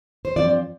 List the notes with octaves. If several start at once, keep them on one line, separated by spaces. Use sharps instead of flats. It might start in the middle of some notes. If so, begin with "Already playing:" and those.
C5
G2 F3 C4 D5